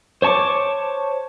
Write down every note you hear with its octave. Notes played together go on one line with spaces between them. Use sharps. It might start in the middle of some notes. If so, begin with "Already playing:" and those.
C5 C#5 A5 C#6 D6